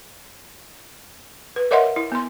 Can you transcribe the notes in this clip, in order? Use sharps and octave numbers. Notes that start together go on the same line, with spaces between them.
B4
A#4 C#5 D#5 E5 F#5 C6
E4
B3 C6